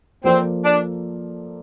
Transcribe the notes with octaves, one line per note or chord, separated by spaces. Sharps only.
F3 A#3 C4 F4 A4 D5
D4